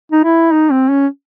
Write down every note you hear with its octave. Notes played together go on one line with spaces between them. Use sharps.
D#4
E4
D#4
C4
C#4